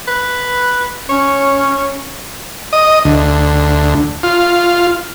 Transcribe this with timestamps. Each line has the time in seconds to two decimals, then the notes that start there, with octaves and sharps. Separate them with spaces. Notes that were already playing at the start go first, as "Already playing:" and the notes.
0.07 B4
1.10 C#4 C#5
2.73 D#5
3.05 D2
4.23 F4